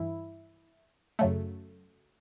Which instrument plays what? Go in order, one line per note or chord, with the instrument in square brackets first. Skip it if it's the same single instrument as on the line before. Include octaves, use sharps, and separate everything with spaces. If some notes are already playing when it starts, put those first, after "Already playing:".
Already playing: [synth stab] G2 E3 E4
F#2 C#3 F#3 A3